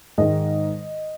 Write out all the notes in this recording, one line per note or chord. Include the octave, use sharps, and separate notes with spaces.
G#2 D#3 G#3 D#5